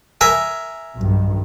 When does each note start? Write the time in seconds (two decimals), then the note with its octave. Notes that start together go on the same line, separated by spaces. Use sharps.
0.21 A#4 E5 G#5
0.95 B1 G2 D#3